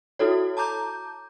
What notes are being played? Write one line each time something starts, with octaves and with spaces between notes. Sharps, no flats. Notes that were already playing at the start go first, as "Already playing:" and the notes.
E4 F#4 A4 C#5
A5 A#5 D6 G6